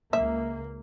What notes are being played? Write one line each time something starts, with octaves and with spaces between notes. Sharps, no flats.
C#2 A#3 E5